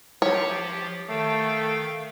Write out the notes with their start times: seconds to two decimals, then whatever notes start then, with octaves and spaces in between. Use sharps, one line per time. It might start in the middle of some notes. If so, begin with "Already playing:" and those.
0.22 F3 G4 C#5
1.09 D#3 A3 F5 G5